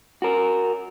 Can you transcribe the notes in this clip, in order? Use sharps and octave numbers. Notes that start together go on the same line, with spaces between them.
F#4 A#4